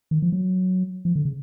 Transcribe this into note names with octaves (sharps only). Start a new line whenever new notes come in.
D#3
F3
F#3
F3
D3
C#3